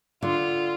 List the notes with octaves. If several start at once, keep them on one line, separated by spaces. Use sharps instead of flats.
D3 F4